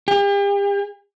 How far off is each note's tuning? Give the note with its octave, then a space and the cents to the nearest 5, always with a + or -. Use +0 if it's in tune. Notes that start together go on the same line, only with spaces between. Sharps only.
G4 +40